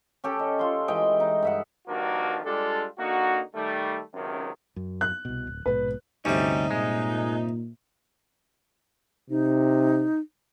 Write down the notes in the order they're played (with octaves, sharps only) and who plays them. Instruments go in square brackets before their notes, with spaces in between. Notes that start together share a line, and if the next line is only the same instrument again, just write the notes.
[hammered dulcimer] C#4 G4 A4
D#5
F4 C6
E3 G#3 D#5 G5
D#4
G2 E5 F#5
[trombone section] G2 D#3 F3 A#3 D4 F#4
G3 G#3 D4 F4 G4 A4
D3 A#3 D#4 F#4
D#3 G3 A3
C#2 F#2 C3 D#3
[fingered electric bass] F#2
[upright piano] F#6
[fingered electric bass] C2 B2
D1
[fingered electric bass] A#1 G#2 B2 [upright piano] B4
[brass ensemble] D2 [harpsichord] G2 C3 [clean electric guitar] G3 C#4 [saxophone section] D#4
[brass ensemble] A#2 [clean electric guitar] G#3
[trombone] C3 [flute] D#4